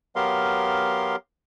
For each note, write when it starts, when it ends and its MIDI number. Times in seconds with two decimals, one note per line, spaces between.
0.16 1.16 54
0.16 1.16 59
0.16 1.16 67
0.16 1.16 70
0.16 1.16 77
0.16 1.16 84